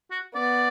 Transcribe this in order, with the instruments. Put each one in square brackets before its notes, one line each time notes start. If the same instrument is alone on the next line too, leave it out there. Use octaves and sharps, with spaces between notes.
[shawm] F#4
[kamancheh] B3 [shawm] D5